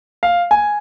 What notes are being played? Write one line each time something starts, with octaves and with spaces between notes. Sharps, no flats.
F5
G#5